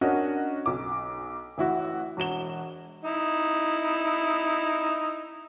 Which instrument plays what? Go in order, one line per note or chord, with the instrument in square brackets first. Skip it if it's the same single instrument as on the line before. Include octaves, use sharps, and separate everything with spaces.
[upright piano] C#4 D4 F#4 A#4 D#5
B1 D6
A1 E4 F#4
E1 F#4 E7 G7
[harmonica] D#4 E4